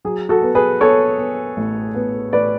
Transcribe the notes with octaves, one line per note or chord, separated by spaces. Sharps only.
F#3 G#4
F#4 A4
B3
G#4 B4
B3 A4 C#5
B3
A1
B3
A1 B4 D5